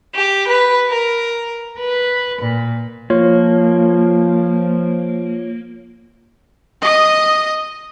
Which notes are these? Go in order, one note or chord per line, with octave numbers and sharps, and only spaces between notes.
G4
B4
A#4
B4
A#2
F3 A#3 F4 C#5
D#5 D#6